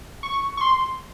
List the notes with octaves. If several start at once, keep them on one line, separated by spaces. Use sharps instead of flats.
C#6
C#6
C6